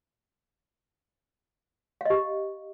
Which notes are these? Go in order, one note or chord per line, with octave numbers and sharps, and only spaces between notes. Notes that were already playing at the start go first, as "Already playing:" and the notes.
G4 D#5 F5